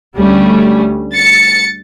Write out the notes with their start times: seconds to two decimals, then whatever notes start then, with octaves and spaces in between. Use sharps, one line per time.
0.17 D2 G3 A3 C#4
1.14 A6 C#7